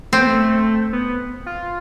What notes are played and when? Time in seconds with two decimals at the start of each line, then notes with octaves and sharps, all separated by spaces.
0.12 A3 C4
0.19 B3
0.27 A3
0.93 B3
1.46 F4